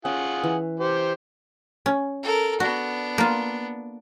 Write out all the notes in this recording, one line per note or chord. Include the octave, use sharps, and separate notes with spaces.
C#4 F4 G#4 F#5
E3
G4 C5
C#4
A4 A#4
B3 D4 F#4
A#3 F4